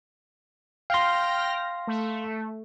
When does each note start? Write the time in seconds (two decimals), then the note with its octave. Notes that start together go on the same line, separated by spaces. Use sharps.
0.90 F5 G5 C6 F6 A#6
1.87 A3